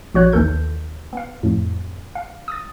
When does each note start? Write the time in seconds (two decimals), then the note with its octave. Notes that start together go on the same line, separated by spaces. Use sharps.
0.14 A#1 F#4 C#5 F#6
0.32 D#2 D#3 E3 A4 G6
1.13 B3 F5
1.43 F2 A2
2.15 F5
2.48 D#6 A6